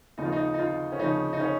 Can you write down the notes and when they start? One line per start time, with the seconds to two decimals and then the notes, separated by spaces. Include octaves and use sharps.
0.18 D#2 C#3 F3 D#4
0.25 F4
0.32 D#4
0.54 D#4
0.59 F4
0.92 C#4
0.99 D#2 C#3 F3 D#4
1.33 D#4
1.40 C#4